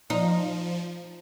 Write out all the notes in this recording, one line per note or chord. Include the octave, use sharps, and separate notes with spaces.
F3 D#4